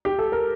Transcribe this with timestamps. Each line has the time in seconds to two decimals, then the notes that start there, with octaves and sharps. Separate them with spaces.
0.05 G4
0.19 A4
0.32 A#4